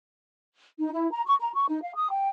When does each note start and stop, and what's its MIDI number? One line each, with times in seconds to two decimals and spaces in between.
0.79 0.90 63
0.93 1.09 64
1.13 1.22 82
1.26 1.36 85
1.41 1.52 82
1.54 1.65 85
1.68 1.79 63
1.82 1.94 77
1.95 2.08 87
2.11 2.29 79